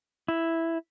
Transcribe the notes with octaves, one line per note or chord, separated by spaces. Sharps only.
E4